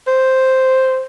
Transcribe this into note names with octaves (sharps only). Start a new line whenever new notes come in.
C5